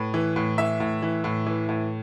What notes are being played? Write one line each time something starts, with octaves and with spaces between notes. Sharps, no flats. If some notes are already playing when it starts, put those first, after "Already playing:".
Already playing: A2 B4
E3
A2
E3 E5
A2
E3
A2
E3
A2